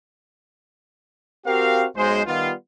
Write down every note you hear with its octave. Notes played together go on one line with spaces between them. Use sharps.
C4 F#4 G4 A#4 F5
B1 G#3 C5
D#3 G3 B3 F4